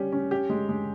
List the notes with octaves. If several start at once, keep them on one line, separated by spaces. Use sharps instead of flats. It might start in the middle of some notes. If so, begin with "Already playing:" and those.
Already playing: G3 C#4 G4
C#4
G4
G#3
G#3